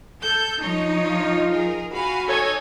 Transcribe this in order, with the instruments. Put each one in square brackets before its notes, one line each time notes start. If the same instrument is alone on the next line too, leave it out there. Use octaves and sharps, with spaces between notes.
[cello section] A4 [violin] G6
[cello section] F3 D#4 [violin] C#5
[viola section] F4
[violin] G#4 A#4
[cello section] F#4 [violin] F5 G#5 [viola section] B5
[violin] D#4 [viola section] A4 C#5 G#5